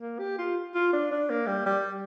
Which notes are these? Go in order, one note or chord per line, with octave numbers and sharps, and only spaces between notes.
A#3
G4
F4
F4
D4
D4
A#3
G3
G3